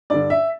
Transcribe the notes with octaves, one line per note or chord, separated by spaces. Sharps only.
G2 D3 D5
E5